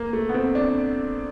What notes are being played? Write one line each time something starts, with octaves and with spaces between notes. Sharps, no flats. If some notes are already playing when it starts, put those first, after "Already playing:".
Already playing: A#3
A3
B3
C4
D4